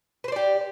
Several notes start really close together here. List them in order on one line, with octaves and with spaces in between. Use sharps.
B4 C5 D5 G4